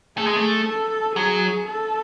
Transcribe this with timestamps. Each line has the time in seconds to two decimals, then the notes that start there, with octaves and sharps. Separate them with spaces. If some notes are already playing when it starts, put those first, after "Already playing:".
0.17 A3 G#4
0.27 G#3
0.36 A3
0.67 A4
1.16 F#3 G#4
1.67 A4